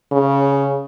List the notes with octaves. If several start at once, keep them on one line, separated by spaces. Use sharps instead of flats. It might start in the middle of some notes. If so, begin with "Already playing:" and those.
C#3